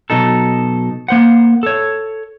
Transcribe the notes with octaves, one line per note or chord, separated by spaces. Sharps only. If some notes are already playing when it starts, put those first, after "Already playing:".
B2 F#3 D#4 A4
A#3 C5 F#5
A4 C#5